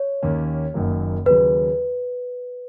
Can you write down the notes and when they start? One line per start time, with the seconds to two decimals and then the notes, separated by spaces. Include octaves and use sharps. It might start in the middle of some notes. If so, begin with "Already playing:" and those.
Already playing: C#5
0.23 D#2 D#3 A#3 C#4
0.74 F#1 F#2 D#3 F#3 A#3
1.26 D#2 C#3 F#3 B4